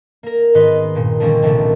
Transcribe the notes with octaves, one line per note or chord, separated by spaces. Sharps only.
A#3 A#4
G#2 D#3 B3 D#4 B4 C6
G2 A#2
D3 D#3 F3 G3 A#3 C#4
B1 C3 D#3 F3 F#3 A3